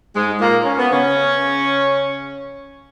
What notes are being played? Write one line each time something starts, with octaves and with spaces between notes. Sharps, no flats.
G#2 G#3
A#2 A#3
C#4
B3
C#3 C#4